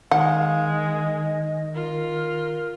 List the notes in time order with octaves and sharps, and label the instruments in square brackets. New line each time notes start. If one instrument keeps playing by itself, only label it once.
[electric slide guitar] D#3 [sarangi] G#3 [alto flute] F5 [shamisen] F#5
[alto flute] D#5
[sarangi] F4 [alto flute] A#4